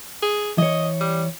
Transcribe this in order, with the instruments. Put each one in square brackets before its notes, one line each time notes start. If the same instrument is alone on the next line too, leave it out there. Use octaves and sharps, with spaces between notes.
[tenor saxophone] G#4
[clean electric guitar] E3 C#5 [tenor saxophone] D#5
[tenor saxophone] G3